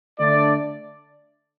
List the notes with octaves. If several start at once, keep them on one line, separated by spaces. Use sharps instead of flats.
D3 A3 D4 D5